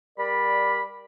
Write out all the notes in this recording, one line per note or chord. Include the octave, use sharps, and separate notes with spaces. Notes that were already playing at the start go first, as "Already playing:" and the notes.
G3 A#4 D5 B5